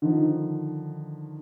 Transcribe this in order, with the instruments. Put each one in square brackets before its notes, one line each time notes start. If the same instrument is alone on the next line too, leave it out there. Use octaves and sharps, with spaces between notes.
[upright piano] D3 D#3 F3